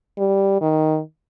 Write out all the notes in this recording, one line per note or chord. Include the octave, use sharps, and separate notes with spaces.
G3
D#3